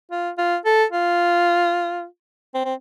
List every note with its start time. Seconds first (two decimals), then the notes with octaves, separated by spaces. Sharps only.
0.11 F4
0.38 F4
0.65 A4
0.92 F4
2.54 C4
2.65 C4